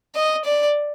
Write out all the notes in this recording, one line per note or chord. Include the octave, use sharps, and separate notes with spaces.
D#5
D5